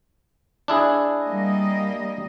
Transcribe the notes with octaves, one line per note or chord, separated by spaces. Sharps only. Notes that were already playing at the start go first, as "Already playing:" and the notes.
D4 E4 G#4
G3 A#3 D#5